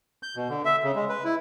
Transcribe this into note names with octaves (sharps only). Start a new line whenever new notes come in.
G6
B2
D3
E5
C#3
G#3
B4
E4